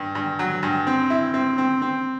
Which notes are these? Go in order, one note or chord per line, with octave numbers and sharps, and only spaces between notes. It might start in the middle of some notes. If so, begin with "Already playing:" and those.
Already playing: G2
G2
F#3
G2
C4
E4
C4
C4
C4